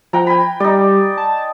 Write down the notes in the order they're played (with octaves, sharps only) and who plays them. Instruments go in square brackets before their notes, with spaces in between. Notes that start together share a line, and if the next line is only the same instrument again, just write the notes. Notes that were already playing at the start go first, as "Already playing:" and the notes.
[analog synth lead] F3 [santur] F#5 G5 A#5
[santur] G5 G#5 B5
[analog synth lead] G3 [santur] D#4 D5
[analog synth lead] A5